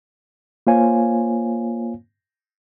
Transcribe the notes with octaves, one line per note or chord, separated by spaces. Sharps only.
A#3 F4 C5 C#5 F5 G#5